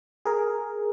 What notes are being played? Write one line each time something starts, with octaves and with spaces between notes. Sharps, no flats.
G#4 A#4